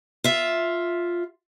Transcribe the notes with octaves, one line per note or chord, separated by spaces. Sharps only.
F4 E5